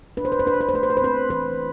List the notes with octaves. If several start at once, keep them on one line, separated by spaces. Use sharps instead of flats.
D4 B4
C5
B4
C5
D4 B4
C5
B4
C5
A3 B4
C5
B4
C5
C4 B4
E3 B4